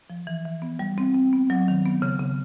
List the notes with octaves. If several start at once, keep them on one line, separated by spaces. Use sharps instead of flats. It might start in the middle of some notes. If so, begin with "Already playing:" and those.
F3
E3
E3
B3
G3
C4
C4
B3
F#3
D#3
B3
C#3
C#3